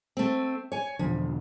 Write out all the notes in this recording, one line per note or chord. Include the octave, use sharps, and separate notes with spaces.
A3 C4
C#5 G#5
E2 B2 D3 F3